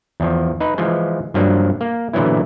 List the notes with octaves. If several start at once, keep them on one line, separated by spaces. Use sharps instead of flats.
E2 F3
D#4 B4
E3 F3 G#3
G2 F3 F#3 A#3 D4
A#3
A#2 D3 E3 F#3 B3 E4